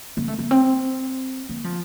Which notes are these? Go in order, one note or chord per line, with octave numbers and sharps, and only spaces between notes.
A#3
A3
A#3
C4
A#3
F3